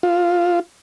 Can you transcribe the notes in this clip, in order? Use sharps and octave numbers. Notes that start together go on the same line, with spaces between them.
F4